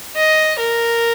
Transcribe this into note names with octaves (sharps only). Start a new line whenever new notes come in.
D#5
A#4